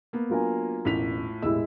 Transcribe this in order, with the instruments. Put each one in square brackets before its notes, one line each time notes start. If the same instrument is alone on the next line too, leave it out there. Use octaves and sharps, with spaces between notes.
[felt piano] A#3 B3
[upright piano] F#3 D4 [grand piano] F4 A#4 G#5
[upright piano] E1 A1 F7 [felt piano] A2 B6
[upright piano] E1 A2 G4 [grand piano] G#3 E4 [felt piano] E6